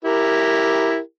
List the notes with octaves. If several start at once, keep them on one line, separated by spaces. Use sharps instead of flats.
E4 G4 A#4